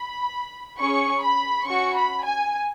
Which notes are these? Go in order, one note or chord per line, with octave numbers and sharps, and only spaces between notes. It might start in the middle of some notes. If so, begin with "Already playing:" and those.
Already playing: B5
C#4 G#4 C#6
B5
C#4 F#4 C#6
B5
G#5